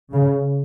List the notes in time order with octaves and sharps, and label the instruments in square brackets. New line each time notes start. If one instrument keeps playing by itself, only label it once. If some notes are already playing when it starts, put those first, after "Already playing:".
[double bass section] C#3